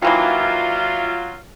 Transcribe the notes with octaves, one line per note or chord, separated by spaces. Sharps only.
D#3 E3 F#3 A#3 F4